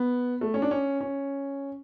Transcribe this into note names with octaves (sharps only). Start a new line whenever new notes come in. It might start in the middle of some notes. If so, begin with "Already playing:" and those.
Already playing: B3
A3
C#4
D4
C#4
C#4